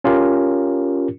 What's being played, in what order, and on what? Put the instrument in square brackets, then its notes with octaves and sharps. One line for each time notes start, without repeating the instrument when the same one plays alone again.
[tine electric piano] C#4 F4 G4 A#4